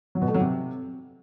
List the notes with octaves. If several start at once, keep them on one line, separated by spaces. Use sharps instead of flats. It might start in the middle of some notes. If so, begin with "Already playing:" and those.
F#3
B2
A3
F#3
C3